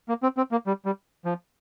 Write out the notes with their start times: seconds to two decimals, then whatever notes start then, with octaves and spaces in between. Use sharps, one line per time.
0.09 A#3
0.23 C4
0.37 C4
0.52 A#3
0.67 G3
0.85 G3
1.25 F3